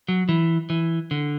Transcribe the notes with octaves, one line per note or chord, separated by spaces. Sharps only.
F#3
E3
E3
D3